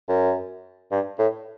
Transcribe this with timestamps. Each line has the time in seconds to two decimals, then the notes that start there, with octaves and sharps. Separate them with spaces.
0.09 F#2
0.91 G2
1.19 A2